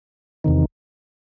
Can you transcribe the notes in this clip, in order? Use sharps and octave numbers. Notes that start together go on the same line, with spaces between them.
E2 C3 D#3